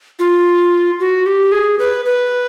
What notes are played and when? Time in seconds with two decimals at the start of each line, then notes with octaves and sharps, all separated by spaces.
0.19 F4
1.00 F#4
1.26 G4
1.52 G#4
1.79 B4
2.05 B4